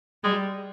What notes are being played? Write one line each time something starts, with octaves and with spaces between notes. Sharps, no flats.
G3 G#3